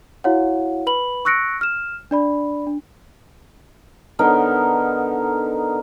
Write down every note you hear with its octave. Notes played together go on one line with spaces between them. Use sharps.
E4 F#4 C#5 F5 F#5
B4 B5 F#7
C#6 E6 F#6 A#6 C#7 D7
F6 E7
D4 D5 B5
D4
D3 B3 D#4 A#4